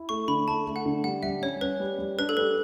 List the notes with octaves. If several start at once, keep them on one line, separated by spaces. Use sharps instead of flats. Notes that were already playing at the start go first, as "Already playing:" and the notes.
Already playing: E4
A3 C#6
D3 B5
A3 A5
A3
F#5
D3
G3 F#5
G3 E5
C#4 C#5
C#4 B4
G3
G3
D4 B4
A4
G3 B4